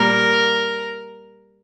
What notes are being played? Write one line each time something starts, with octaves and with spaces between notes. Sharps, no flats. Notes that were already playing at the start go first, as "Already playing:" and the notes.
Already playing: A#2 G3 A#3 A#4